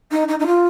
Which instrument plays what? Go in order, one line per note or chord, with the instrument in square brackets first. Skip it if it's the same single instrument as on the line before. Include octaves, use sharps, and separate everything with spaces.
[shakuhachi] D#4
D#4
D#4
F4